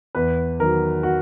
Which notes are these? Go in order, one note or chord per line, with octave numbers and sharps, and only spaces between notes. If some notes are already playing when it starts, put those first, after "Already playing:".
E2 B4
D#3 F#3 A#4
F#4